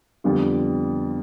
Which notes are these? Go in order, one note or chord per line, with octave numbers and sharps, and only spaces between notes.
F2 D3 G3 B3 F4